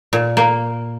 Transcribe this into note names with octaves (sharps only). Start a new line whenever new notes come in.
A#2
A#3